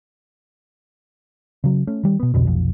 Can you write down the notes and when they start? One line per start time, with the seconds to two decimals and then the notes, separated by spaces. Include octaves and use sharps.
1.64 C#3 F#3
1.87 A3 C#4
2.03 D#3 G3
2.20 B2 B3
2.34 B1 F2 B2 D3
2.47 F1 B1 F2